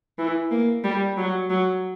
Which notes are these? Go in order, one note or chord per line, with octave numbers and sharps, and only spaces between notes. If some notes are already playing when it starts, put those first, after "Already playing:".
E3
A#3
G3
F#3
F#3